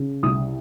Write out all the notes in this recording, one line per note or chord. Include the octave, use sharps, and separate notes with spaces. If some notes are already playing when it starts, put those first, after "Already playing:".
Already playing: C#3
C2 D#6